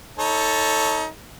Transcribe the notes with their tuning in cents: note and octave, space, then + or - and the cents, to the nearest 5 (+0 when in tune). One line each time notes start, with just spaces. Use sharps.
D#4 +30 A4 +0 C#5 +0